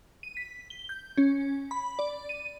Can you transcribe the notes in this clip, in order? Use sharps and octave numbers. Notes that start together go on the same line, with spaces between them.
D#7
B6
G7
G6
C#4
B5
D5
D#7